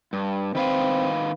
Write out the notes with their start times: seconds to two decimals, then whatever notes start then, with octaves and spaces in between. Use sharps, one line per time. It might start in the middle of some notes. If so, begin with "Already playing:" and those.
0.13 G2
0.55 D#3 C4 B4 F5